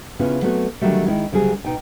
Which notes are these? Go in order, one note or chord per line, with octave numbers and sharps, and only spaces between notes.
C#3 B3 C#4 E4 F4
F#3 A3 B3 C4 F4 F#4
D3 D#3 F#3 G3 A3
D#3 G#3 E4
D2 C#3 F#3 G3 G#4
B2 D#4 G5